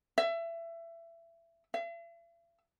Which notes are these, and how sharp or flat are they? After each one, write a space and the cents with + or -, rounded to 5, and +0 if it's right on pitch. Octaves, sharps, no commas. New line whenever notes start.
E5 +25
E5 +45